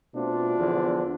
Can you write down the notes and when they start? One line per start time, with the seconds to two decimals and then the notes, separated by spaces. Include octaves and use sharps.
0.14 B2 A3 C4 D4 F4
0.58 E2 D3 F3